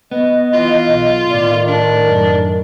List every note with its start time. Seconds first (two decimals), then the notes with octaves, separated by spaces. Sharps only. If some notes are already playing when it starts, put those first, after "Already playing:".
0.11 B3 D#5
0.54 E3 F4
0.91 B1
1.29 A2 D#3 D5
1.68 D4 A#4
2.07 F#2